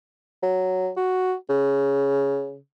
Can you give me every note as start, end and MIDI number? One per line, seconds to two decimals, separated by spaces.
0.43 0.90 54
0.97 1.35 66
1.49 2.57 49